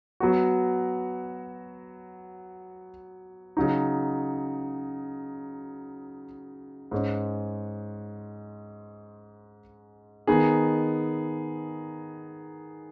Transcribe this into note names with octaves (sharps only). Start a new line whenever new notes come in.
F#3 B3 F#4
C#3 F#3 D#4
G#2 G#3 C#4
D#3 B3 D#4 G#4